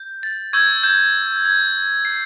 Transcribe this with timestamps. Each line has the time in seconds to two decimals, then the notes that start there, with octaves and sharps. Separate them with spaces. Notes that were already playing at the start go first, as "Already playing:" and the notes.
Already playing: G6
0.23 A6
0.53 C#6 E6 G6 G#6
0.83 G6
1.45 G#6
2.05 C7